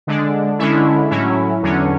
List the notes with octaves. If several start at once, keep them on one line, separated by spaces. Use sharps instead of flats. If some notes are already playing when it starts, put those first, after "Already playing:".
D3 G#3 D4
D3 G#3 C#4 E4
A2 F#3 C#4 E4
E2 D3 F#3 C#4